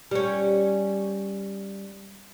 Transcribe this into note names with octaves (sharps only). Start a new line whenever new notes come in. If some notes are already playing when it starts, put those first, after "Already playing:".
G3 C#4